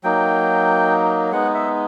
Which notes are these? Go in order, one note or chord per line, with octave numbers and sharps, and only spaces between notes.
F#3 A#3 D#4 G5
G#3 B3 D#4 F#5
E5